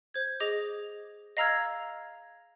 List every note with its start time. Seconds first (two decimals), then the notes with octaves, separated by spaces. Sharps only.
0.14 C5 G#6
0.40 G#4 D#5 D6
1.37 D#5 F5 A#5 E6 F6 G#6